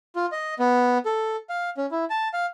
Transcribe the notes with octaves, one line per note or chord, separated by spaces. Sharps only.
F4
D#5
B3
A4
F5
C#4
E4
A5
F5